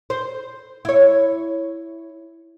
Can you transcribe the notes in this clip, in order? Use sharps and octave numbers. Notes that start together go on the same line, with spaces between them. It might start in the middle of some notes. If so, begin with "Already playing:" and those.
C5
E4 C#5